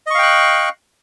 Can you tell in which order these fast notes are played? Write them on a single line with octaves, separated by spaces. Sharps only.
D#5 C#6 F5 G5 F#6